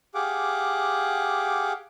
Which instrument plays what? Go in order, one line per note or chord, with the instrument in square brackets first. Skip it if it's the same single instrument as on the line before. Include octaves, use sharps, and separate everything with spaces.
[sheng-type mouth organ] G4 G#4 F5 F#5 D6